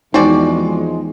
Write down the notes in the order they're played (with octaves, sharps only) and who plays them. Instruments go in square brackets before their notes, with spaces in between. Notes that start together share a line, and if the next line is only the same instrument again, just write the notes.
[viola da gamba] E2 [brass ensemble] F3 G#3 [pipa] C4 F#4 D5 [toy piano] D#4